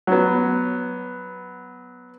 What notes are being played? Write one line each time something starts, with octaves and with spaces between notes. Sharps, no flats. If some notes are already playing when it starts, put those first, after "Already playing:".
F#3 B3